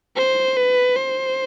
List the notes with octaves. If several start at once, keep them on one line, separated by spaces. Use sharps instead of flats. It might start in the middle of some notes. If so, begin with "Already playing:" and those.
C5
B4
C5